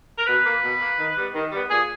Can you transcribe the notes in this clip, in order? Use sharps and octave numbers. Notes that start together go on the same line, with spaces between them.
A#4
B2 B4
A#3
B2
A#3
D#3
G3 B3
D#3
G3 B3
A#2 G#4